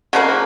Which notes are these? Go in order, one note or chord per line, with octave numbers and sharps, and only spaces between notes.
C#3 F3 A#3 F#4